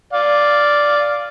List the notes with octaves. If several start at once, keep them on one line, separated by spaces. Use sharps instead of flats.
D5 F5